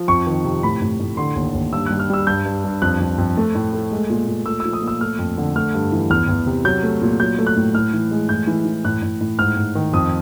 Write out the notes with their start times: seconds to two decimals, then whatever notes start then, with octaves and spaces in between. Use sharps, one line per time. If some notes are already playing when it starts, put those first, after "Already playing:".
Already playing: F3
0.08 F2 C#6
0.27 D#3
0.45 C3
0.63 A2 B5
0.82 A2
0.99 A2
1.17 D3 C6
1.36 D#2
1.54 D#2
1.73 G2 E6
1.86 G3 F#6
1.99 F6
2.10 G3 E6
2.27 G2 G6
2.45 G2
2.64 G2
2.82 F2 F#6
3.00 F2
3.18 F2
3.37 A3
3.55 A2
3.73 A3
3.92 G#3
4.10 A#2
4.28 A#2
4.46 A3 E6
4.60 E6
4.65 F3
4.73 D#6
4.83 A#2 E6
5.01 A3 F6
5.19 F2
5.38 D3
5.56 A3 F6
5.74 G2
5.92 E3
6.10 E2 F6
6.29 E2
6.46 C3
6.65 F#3 G6
6.83 A3
7.02 A#2
7.20 F#3 G6
7.39 A3
7.47 F#6
7.56 A2
7.75 A2 F6
7.93 E3
8.11 G#3
8.29 A2 G6
8.47 E3
8.65 E3
8.85 A2 F#6
9.02 A2
9.21 A2
9.39 G#2 F6
9.57 G#2
9.75 D#3
9.93 F2 D#6